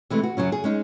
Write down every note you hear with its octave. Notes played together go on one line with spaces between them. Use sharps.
C3 E3 G#3 A3
F#4
F#2 A2 C#3 F#3 C#4
G#4
G#3 C#4 D#4